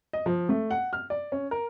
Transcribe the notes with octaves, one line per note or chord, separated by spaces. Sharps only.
D#5
F3
A3
F#5
F6
D5
C#4
A#4